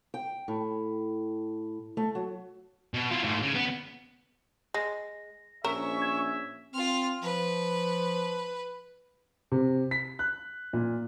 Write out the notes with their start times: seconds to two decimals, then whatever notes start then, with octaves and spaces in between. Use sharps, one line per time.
0.14 G5
0.48 A2
1.97 A3
2.15 F#3
2.94 B2
3.11 E4 F4
3.23 G#2 A3
3.42 C#3
3.54 B3
4.74 G#3 A#6
5.64 A#1 C#4 A#4 E5 C#6 E7
6.02 G#6
6.74 C4 F4 F6
7.22 F3 B4
9.52 C3
9.91 B6
10.19 F#6
10.73 A#2